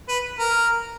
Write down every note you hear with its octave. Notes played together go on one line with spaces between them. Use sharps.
B4
A#4